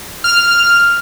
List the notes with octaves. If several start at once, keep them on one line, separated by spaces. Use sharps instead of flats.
F6